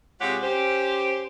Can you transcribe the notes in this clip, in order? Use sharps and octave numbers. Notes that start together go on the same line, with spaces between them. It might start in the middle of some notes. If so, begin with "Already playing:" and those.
C3 G#3 F4 G4 C#5 F#5
C#4 G4 C5